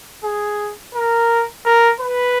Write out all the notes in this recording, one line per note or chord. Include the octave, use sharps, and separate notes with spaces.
G#4
A#4
A#4
B4